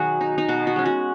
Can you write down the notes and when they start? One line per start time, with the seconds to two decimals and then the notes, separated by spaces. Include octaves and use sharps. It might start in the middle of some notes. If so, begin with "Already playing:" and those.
Already playing: B2 D#3 F#3 B3 F#4 G#4
0.21 D#4
0.38 D#4
0.48 B2 F#4
0.67 F#4
0.76 G#3 C#4
0.85 F#4